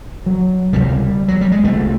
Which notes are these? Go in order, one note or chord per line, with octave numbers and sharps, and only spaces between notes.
F#3
C#2 C3 G3
F#3
G3
G#3
C2 C3 A3